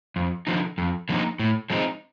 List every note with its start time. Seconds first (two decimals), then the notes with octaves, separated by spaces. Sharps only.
0.16 F2
0.47 D3 F3 A#3 D#4
0.78 F2
1.09 D3 F3 A#3 D#4
1.39 A2
1.70 F3 G#3 C4 D#4